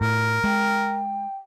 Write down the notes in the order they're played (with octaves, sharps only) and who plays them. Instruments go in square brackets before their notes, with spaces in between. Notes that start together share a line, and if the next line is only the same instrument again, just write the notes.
[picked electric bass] A2 [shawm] A#4
[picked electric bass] G#3 [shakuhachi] G5